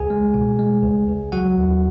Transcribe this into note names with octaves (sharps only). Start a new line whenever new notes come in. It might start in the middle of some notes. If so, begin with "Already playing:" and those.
Already playing: C#2 G#4 G#5
G#3
B2
G#3
C#2
C#2
F#3 F#4 F#5
D#2